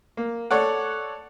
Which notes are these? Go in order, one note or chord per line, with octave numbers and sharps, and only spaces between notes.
A#3
A4 C#5 D5 F#5